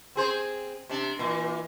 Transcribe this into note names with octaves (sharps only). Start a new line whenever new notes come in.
C4 G#4 C5
C3 D4
A#2 E3